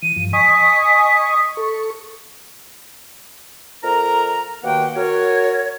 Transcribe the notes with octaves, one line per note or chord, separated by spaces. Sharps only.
E3 D#7
G2 F3
D#5 G#5 C#6 D#6 B6
A4 C#6
F2 A#4 A#5
D#2 B2 D#3 A#3 F#5 G5
F#4 A#4 C#5